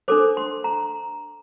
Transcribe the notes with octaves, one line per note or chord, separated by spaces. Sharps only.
D4 A4 C5 D6
C6
A#5